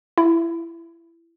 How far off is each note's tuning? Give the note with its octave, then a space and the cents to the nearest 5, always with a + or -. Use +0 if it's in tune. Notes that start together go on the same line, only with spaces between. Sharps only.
E4 +20